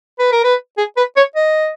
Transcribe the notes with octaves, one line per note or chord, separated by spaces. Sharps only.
B4
A#4
B4
G#4
B4
C#5
D#5